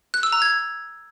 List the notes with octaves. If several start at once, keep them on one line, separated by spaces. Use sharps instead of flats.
F#6
E6
A#5
G#6